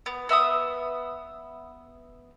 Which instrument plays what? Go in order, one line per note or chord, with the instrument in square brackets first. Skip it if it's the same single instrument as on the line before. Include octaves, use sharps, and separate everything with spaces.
[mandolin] B3
B3 E5 B5 D#6